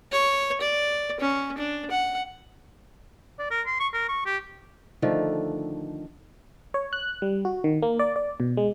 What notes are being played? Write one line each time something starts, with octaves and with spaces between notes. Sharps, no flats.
C#5
D5
C#4
D4
F#5
D5
A#4
C6
C#6
A#4
C#6
G4
D3 D#3 F3 A3
C#5
F#6
G3
F#4
D#3
A#3
D5
D5
B2
G#3